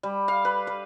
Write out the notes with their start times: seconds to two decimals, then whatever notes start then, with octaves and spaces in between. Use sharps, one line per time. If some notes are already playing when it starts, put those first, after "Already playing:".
0.03 G3
0.28 F5
0.45 B4
0.67 B4